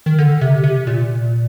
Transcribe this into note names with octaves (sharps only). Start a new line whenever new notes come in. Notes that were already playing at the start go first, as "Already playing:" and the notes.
D#3
D3
C3
C3
A#2